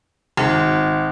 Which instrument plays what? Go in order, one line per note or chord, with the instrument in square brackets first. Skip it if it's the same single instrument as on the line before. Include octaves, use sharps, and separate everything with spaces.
[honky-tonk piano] G#1